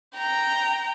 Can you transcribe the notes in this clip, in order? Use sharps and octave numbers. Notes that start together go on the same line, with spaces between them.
G5 A#5